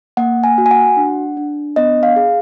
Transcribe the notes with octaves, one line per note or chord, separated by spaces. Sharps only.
A#3 F#5
G#5
F#4
G#5
F#5
D4
D4
B3 D#5
F5
G#4